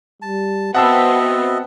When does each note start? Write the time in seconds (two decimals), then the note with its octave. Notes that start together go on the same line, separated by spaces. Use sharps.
0.22 G3 A5
0.74 B3 C4 F#4 D#5 E5 F#5 A5 E6